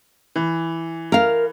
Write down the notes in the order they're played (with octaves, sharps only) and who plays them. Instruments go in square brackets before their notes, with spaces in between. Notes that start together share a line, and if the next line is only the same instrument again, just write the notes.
[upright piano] E3
[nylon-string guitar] A#4 F5